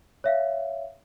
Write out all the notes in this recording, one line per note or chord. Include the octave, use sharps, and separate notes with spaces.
C#5 E5 F5